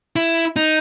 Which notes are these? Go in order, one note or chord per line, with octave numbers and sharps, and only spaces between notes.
E4
D#4